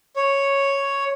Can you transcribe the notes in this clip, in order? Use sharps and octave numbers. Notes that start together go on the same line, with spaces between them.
C#5